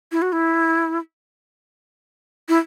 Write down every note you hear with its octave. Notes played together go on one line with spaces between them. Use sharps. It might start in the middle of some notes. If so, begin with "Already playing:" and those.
E4
F#4
E4
E4